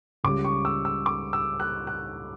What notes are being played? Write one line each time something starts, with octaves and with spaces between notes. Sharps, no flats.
C#2 C#3 G3 D6
C#6
E6
E6
D6
E6
F#6
F#6